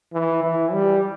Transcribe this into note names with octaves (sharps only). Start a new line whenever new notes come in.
E3
E3
G3